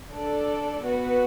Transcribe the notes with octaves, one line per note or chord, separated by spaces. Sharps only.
D4 A4 D5
B3 F#4 B4